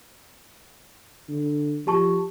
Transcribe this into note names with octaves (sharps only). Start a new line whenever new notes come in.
D3
F3 G4 A5 C#6